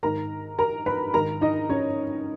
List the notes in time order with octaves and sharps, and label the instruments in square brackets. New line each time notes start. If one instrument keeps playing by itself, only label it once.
[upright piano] G#2 D#3 A#4 A#5
A#4 A#5
B4 B5
G#2 D#3 A#4 A#5
D#4 D#5
C#4 C#5